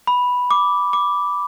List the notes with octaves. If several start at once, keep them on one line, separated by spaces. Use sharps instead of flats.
B5
D6
D6